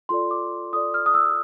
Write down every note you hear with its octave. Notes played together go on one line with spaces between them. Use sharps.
F4 A4 D5 C6
D6
F4 A4 D5 D#6
F6
D#6
E6